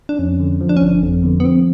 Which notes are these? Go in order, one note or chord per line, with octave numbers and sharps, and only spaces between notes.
D4
F2 C#4
D3
F3
D4
C#4
G1 D4
F2 C4
D3 B3
B3
F3 C4